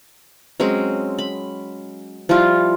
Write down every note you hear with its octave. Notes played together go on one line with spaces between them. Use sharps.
F#3 G#3 C4 C#4
B5
F3 G3 E4 F4